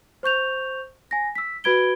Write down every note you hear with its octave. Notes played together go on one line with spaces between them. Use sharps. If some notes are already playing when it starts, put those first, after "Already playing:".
C5 C#6 G6 F7
G#5 A#6
E6 B6
F#4 B4 B5 G#6 D7 G7